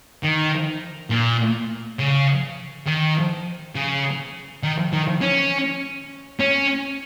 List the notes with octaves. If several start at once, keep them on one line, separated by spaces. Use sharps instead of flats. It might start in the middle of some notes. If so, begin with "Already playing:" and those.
D#3
A#2
C#3
D#3
C#3
D#3
D#3
C#4
C#4